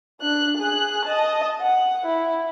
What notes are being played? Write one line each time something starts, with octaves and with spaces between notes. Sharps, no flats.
D4 F#6
G#4 F#6
D#5 A5
F#5
E4